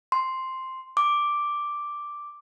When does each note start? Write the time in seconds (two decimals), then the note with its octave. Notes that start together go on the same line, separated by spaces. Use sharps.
0.12 C6
0.97 D6